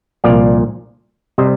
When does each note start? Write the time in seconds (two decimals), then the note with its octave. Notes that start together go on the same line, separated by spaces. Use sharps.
0.24 C2 A#2 F3 D5 F5
1.38 C3 G3 C5 D#5